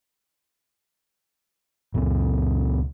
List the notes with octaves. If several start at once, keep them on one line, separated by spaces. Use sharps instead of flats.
C#2 A#2